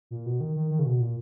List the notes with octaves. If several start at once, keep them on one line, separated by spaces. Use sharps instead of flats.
A#2
B2
D#3
D#3
D#3
C#3
B2
A#2